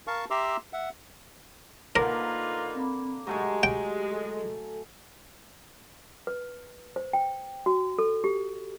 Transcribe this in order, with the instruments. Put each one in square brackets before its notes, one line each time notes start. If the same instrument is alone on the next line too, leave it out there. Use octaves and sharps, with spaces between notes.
[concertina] A#4 F5 A5 C#6
G4 E5 A#5 C6 D6 E6
E5 F#5
[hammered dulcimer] D3 A#3 [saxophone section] D#4 F4 B4 [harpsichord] A#4
[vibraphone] C4 B5
[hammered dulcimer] F#3 A3 G#5 [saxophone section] G#3 [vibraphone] G4
[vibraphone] G4 [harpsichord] G5
[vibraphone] A4
[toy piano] B4
C5
G5
F#4
A4
G4